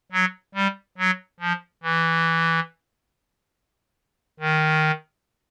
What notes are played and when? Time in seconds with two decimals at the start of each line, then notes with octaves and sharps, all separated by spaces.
0.12 F#3
0.55 G3
0.98 F#3
1.40 F3
1.83 E3
4.40 D#3